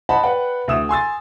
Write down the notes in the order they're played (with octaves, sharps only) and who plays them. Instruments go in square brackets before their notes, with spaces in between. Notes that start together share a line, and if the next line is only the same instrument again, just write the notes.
[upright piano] C5 D#5 F#5 A5 B5
B4 D5 F#5 G5
D2 E5 D#6 E6 E7
G#5 C6 E6 A6